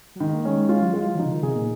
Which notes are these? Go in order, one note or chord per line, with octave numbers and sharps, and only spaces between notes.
F#3
D#3 G#3
A#3
G#3 C#4
G#3
G#3 F4
F#3
G#3 F4
F#3
D#3
F3 D#4
C#3
D#3
C3 G#4
A#2